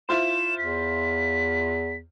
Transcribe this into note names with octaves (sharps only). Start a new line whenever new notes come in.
E4 F4 C5 E7
E2 B6